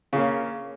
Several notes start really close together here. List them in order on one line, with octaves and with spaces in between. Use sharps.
C#3 A#3 C#4